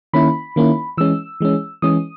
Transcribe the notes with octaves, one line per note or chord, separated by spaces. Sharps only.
D#3 A#3 C#4 E4 B5
D#3 A#3 C#4 E4
E3 G#3 C#4 E6
E3 G#3 C#4
E3 G#3 C#4 D#6